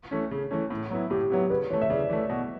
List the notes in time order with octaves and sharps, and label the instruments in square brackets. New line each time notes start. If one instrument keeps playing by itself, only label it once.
[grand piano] E3 A3 C#4
C#3
E3 A3 C#4
A2
F#3 B3 E4
[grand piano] A2 [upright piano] G4
[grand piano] F#3 B3 E4
[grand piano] C#3 [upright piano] B4
[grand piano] E3 [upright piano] C#5
[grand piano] A3
[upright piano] E5
[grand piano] C#3 [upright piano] D5
[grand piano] E3 A3
B2